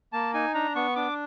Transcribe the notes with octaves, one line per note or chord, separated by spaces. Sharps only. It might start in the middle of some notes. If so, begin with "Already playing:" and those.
A#3 A5
D#4 G#5
D4 A#5
B3 C#6
D4 D6